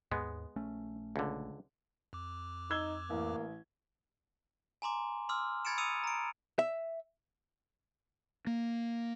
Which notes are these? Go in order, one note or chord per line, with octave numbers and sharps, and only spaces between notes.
D#2 G#2 G#3 B3
A#1 A3 C#4
C#2 D3
F2 D6
D#4 E6 G#6 G7
A1 A#3
G#5 A#5 C6 D6
C6 D6 E6 F6
B5 G#6 A6 C#7 D7 E7
D#6 E6 C#7 D#7 F7
A#5 D7
E5
A#3